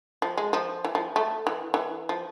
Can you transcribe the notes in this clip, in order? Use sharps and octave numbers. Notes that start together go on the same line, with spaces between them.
F3
G#3
F3
E3
F3
A3
E3
E3
F3